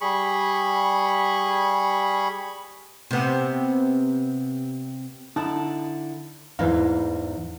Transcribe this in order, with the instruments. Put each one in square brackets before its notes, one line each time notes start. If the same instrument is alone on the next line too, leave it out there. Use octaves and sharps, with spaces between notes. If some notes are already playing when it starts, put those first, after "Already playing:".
[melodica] G3 G#4 B5 C#6
[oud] C3 B3
[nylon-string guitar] D3 E4 [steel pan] D#4 A5
[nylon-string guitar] E2 G#2 D#4 [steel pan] E4 B4 F5